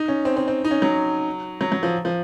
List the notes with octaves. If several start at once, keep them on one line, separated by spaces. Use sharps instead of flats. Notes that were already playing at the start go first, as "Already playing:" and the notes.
Already playing: D#4
C#4
C4
C4
C4
D#4
C#4
F#3
F#3
F#3
F3
F3